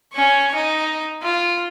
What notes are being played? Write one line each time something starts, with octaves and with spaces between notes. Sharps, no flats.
C#4 C#6
D#4
F4